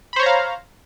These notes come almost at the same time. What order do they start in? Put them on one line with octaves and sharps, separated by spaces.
B5 C5 C#5 A#5 F5